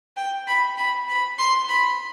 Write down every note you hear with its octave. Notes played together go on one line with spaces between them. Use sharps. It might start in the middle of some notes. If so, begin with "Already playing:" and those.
G5
B5
B5
B5
C6
B5